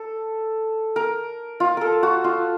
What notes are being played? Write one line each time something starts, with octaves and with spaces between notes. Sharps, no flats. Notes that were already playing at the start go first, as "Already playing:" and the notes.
Already playing: A4
A#4
F4
A4 A#4
F#4
F4